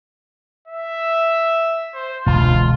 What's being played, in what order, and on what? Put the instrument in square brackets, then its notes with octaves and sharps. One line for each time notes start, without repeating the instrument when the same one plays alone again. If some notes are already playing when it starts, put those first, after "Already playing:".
[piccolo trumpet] E5
C5
[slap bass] E1 C#2 D3 [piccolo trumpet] F4